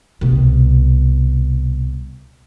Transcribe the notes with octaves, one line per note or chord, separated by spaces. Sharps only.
C2 B2